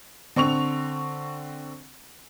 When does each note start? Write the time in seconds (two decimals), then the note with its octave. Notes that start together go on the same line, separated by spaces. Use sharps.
0.36 D3 C4 C#6 F7